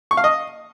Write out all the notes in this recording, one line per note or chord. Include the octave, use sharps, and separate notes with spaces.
C#6
F5
D#5